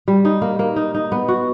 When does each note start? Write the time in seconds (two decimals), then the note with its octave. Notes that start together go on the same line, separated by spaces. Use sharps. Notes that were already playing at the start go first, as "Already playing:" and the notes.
0.08 G3
0.25 D#4
0.42 A#3
0.59 A#3
0.76 D#4
0.95 D#4
1.12 B3
1.28 F#4